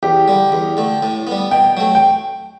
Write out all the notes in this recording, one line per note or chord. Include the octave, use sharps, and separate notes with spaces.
E2 G4
D3 G3
E2
D3 A3
A2
G3 B3
B2 G5
F#3 A3
G5